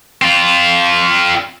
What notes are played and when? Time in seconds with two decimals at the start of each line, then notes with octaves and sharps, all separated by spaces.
0.22 C4 F4